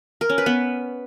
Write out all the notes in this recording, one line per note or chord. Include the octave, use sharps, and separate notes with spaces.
A#4
C#4
B4
B3